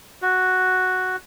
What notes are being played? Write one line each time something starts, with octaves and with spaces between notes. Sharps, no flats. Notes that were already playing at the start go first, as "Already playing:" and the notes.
F#4